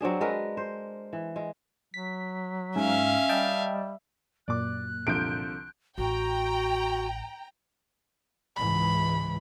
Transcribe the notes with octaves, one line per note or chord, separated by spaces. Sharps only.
F#3 C4 D4 G#4
G#3 A#4 B4
C5
E3
G#3
F#3 B6
G#2 C#4 E5 F5
G3 D#5 G5 A5
F#2 A#2 D5 D6 F#6
C2 D3 F3 G6 D7
A1 F#4 G5 A#5
C#2 G#2 E3 B5